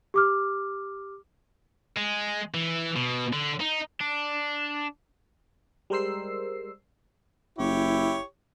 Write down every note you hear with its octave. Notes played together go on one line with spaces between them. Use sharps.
G4 D6 F6
G#3
E3
B2
D3
D#4
D4
G3 G#3 A#4 C5 E6 C7
F#1 E4 G4 C#5